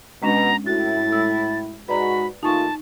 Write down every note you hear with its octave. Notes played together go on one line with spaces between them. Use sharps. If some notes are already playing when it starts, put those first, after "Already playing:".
B2 G#3 C#4 D4 A#5
A2 E4 F#4 A6
G#3 E6
G#2 G#3 F#4 B4 D5 A#5 B5
D#2 A3 D#4 F4 G#5 A5 C#6